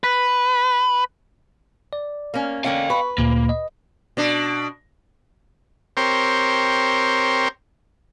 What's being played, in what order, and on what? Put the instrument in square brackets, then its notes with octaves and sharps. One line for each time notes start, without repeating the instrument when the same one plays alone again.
[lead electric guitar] B4
[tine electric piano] D5
[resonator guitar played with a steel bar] A#3 C#4
[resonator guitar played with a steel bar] D3 A#3 C#4 [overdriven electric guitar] F5 G5
[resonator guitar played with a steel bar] B4 [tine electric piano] C#6
[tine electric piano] D2 A#2 [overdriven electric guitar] A#3
[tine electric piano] D#5
[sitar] B2 D4
[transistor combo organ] C4 G4 A#4 C5 C#5